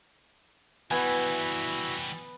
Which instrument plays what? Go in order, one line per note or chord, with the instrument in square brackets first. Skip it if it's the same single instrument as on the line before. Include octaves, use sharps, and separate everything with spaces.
[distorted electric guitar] E3 G3 [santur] B3 [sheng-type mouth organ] E4 F#4 [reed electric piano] G#5 G#6